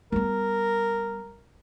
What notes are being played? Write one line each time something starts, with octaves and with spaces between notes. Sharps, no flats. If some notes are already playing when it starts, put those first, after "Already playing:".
G3 B3 A#4